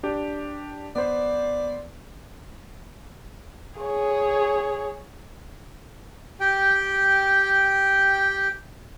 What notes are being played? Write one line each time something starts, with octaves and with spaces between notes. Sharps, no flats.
D4 G4
B3 C5 D5
G#4 C#5
G4 G5